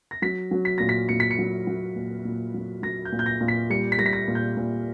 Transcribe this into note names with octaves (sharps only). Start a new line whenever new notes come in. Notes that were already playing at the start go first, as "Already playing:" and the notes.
A#6
F#3 B6
F#3
B6
A#2 A#6
B6
A#2 C#7
B6
C#7
F#3
F#3
A#2
A#2
F#3
F#3 A#6
G6
A#2
G6
A#6
A#2
B6
G3 C#7
B6
G3 A#6
B6
A#6
A#2
G6
A#2